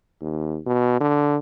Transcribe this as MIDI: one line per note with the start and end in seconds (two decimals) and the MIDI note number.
0.21 0.58 39
0.66 0.99 47
1.00 1.38 50